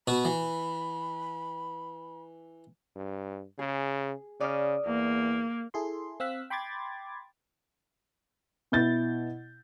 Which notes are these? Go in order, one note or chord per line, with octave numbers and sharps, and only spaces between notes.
B2 F#4 B5
E3
G2
C#3 G#4
C#3 D5 D#6 F6
E2 A#3
E4 G#4 A4 C6
C4 F5 E6 F#6 B6
G5 B5 C6 D6 G#6 A6
B2 E4 G6 A6